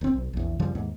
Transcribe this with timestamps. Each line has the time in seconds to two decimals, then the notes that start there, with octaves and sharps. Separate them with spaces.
0.01 D1 C4
0.13 B1
0.33 A#1 E2
0.59 F#2 C#3 F3 G3
0.75 D#2 G#2